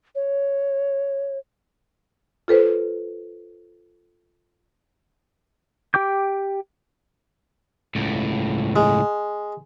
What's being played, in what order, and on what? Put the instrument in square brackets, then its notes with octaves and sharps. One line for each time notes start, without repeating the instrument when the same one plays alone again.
[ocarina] C#5
[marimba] F4 A4 B4 C5
[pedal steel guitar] G4 G5 D6 G6
[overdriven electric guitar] C#2 A2
[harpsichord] G#3